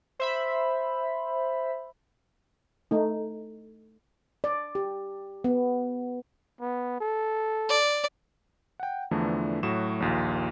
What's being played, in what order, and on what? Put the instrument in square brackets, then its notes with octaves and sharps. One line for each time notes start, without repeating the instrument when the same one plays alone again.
[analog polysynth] C5 E5 B5
[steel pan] A3 D#4
[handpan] D5
G4
B3
[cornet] B3
A4
[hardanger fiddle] D5
[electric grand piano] F#5 G5
E2 D3 E3 F3 A3 D4
A2 F#3 F#4 E7
A#1 D#2 F4